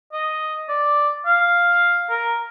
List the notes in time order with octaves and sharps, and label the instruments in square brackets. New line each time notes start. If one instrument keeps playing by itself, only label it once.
[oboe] D#5
D5
F5
A#4